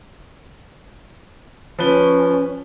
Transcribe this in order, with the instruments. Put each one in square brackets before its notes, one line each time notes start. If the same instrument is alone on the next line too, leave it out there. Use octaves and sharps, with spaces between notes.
[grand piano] F3 B4 G7 [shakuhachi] C#4